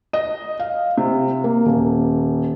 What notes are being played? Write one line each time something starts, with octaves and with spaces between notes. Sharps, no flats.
D#5
F5
C3
A#3
D#1